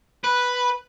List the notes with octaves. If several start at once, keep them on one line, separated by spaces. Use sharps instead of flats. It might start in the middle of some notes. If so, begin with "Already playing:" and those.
B4